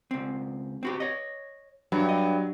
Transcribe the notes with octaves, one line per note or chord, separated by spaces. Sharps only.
C#2 C4
C4 F#4 G4
C#5 D#5
G2 F#3
D#5